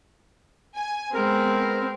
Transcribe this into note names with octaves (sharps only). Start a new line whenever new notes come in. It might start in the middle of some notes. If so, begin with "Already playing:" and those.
G#5
G#3 B3 C4 A#4